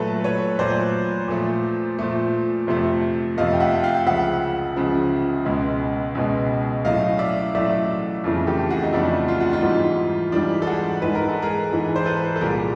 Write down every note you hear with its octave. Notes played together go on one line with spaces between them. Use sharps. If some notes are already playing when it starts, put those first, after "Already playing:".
Already playing: A#2 F#3 A3 A4 B4
B4 C#5
A#2 F#3 A3 C5 D5
A#2 F3 A3
A#2 F3 A3
F2 C3 F3 A3
F2 C3 F3 A3 D#5 F5
G5
E5 F#5
F5 G5
C#2 C#3 F3 E5 F#5
C#2 C#3 F3
C#2 B2 G#3
C#2 B2 G#3
A2 F#3 A3 D#5 F5
D5 E5
A2 F#3 A3 D5 E5
F2 C#3 E3 A3
G4 A4
F#4 G#4
D#4
F2 C#3 E3 A3 D4 E4
F4
F#4
D#4 F4
G#2 E3 G3
G#2 E3 G3 D4
A4
F#4 G#4
G#2 E3 G#3 B4
A#4
A4
G#4 A#4
G#2 E3 G#3
C5
A4 B4
A4
C2 A#2 G3 G#4 A#4